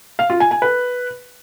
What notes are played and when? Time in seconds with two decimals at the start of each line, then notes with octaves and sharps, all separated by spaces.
0.19 F5
0.30 F4
0.40 G#5
0.51 G#5
0.62 B4